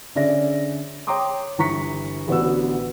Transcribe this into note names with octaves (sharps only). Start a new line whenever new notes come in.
D3 C#4 G#4 D5 E5 A#6
C#5 G5 A#5 C6 D6 D#6
G1 E3 A#5 C#6 B6 C#7
A1 D3 B3 F#4 E6